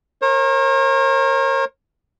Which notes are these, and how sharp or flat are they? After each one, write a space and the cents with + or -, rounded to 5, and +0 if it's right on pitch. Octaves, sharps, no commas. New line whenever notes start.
A#4 +0 C#5 -45